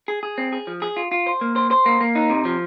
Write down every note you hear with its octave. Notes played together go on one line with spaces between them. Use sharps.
G#4
G#4
C4
G#4
F3
G#4
F4
F4
C5
A#3
C5
C5
A#3
A#3
D#4
C3
F3